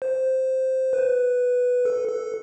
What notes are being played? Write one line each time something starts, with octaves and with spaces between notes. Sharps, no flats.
C5
B4
A4
A4